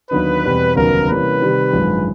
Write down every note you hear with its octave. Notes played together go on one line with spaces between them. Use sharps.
D#2 D3 F#3 B3 D#4 B4
E2 B2 G3 C4
F1 D#2 C#3 F#3 B3 A#4
C3 E3 G3 A#3 C#4 B4
C3 D#3 G3
G#1 F#2 D3 F3 G#3